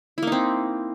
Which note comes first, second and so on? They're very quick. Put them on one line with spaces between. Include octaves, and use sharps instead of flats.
E4 A#3 D#4 C4